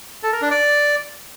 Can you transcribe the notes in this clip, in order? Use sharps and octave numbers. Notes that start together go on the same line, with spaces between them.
A4
A#4
D4
D5